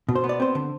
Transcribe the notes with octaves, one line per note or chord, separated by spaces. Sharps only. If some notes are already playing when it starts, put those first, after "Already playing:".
B2
C5
B3
D5
C4 C5
D3